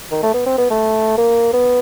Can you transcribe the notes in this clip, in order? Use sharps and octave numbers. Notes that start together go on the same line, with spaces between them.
D#3
A3
B3
C4
B3
A3
A#3
B3